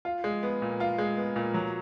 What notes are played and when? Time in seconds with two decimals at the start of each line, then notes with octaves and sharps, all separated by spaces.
0.05 F4
0.24 G#3
0.43 B3
0.62 A#2
0.80 F4
0.98 G#3
1.17 B3
1.36 A#2
1.54 F#3